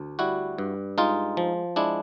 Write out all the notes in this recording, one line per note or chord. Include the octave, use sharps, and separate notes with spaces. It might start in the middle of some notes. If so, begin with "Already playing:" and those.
Already playing: D2
G3 E4 F#4
G2
G#3 D#4 F4
F3
G#3 D4 E4